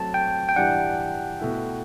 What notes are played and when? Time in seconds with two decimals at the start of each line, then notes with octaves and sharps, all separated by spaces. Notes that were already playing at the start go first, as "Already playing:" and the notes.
Already playing: F#3 A3 C4 F#4 A5
0.14 G5
0.49 G5
0.56 E3 G3 D4 F#5
1.40 B2 A3 E4